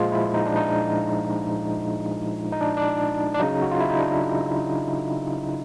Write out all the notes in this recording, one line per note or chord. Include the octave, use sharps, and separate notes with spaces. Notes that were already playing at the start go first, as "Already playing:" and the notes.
Already playing: A#2 F3 G#3 F4
E4
D#4
D4
D#4
D#4
D4
D4
D4
C#3 F#3 D#4
F#4
F4
E4
D#4
D4